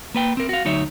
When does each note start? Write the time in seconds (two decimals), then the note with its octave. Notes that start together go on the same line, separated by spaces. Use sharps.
0.15 A#3 B4 G5
0.37 C4 A#4
0.49 F#4 F5
0.65 D2 F#3 D#4 C#5 E5